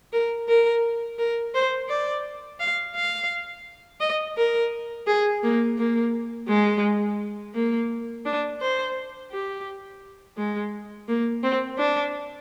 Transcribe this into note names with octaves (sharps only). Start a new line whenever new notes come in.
A#4
A#4
A#4
C5
D5
F5
F5
D#5
A#4
G#4
A#3
A#3
G#3
A#3
D4
C5
G4
G#3
A#3
C4
D4